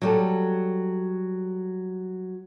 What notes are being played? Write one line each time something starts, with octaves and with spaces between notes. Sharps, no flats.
F#3 G3 A4